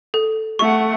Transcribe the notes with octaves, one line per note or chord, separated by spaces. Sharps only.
A4
A3 F#5 C#6